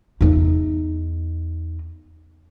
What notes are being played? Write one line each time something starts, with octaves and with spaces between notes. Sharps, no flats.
E2 D#4